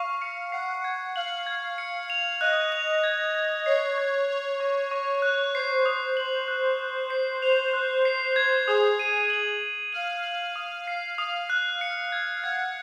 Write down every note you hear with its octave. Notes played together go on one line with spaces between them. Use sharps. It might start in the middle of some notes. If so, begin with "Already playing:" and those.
Already playing: F5 C#6
C#7
F#5 C7
G#6
F5 F#7
G#6
C#7
F7
D#5 F#6
F7
G#6
G#6
C#5 C7
G#6
C#5 F7
C#6
C#6
F#6
C5 C7
D#6
F#7
F#6
F#6
C7
C5 F7
F#6
C7
G#6
G#4 D#6
D#7
F#7
D#7
F5 F#7
F#7
D#6
C7
F5 D#6
F#6
C#7
G#6
F#5 G#6